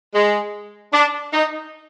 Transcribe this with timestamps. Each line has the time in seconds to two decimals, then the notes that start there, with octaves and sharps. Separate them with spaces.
0.14 G#3
0.93 D4
1.33 D#4